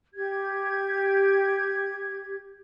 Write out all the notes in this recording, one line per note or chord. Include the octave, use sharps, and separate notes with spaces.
G4 G#6